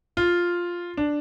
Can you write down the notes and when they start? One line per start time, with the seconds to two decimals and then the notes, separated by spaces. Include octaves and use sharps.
0.17 F4
0.97 D4